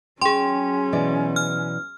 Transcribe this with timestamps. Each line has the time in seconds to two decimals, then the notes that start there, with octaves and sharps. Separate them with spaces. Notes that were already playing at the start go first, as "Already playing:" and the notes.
0.21 F#3 C#4 G#4 G5 C6
0.93 B2 E3 D5
1.36 F6